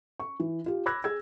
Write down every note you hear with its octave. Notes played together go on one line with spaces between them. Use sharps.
C#6
E3
F4 G4
B5 D6 E6 F#6 G#6 A#6
G#4 E6 G#6